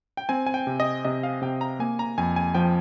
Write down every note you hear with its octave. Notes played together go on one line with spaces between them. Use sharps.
G5
C4 G#5
G#5
G5
C3
D#5
C3 D#5
F5
C3 G5
A#5
A#3 G#5
A#5
F2 G#5
G#5
F3 G5